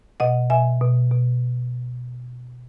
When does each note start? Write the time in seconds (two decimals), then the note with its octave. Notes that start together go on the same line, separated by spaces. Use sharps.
0.20 B2 D#5 F#5
0.50 B2 E5 G#5
0.81 B2
1.11 B2